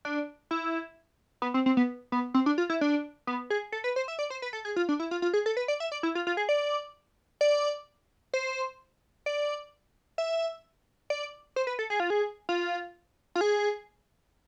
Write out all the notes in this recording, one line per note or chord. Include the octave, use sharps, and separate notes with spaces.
D4
E4
B3
C4
C4
B3
B3
C4
D4
F4
E4
D4
B3
G#4
A4
B4
C5
E5
D5
C5
B4
A4
G#4
F4
D4
E4
F4
F4
G#4
A4
B4
D5
E5
D5
E4
F4
F4
G#4
D5
D5
C5
D5
E5
D5
C5
B4
A4
G#4
F4
G#4
F4
F4
G#4